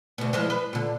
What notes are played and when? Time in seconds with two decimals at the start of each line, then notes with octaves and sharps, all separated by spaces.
0.18 D2 B2
0.33 E3 F3 G#3
0.50 B4
0.73 A#2 D3